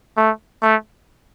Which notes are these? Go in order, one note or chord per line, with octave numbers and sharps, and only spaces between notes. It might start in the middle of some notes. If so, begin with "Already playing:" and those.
A3
A3